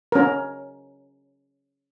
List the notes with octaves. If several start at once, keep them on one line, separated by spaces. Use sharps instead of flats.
C#4 A#4